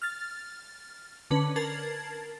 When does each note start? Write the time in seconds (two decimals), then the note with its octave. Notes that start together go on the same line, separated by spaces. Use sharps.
0.02 F6 A6
1.31 D3 C#4 B4
1.56 A#4 A5 G#6 A6 C7 F#7